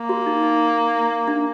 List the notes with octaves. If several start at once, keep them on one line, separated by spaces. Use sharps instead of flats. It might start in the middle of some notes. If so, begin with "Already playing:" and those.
Already playing: A#3
F#4
D#4
D#4
D4